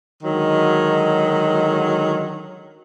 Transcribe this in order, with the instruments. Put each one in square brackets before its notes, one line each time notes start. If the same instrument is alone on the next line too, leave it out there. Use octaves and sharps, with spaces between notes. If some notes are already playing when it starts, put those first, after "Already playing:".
[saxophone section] D3 D#3 F#3 G#3